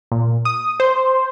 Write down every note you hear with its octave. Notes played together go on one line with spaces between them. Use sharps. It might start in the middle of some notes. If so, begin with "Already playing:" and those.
A#2
D#6
C5